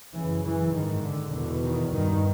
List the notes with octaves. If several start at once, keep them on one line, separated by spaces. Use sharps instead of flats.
F#2 C#3 E3
E3
G#2 D#3
D3
E2 B2 D3
D#3
G2 D#3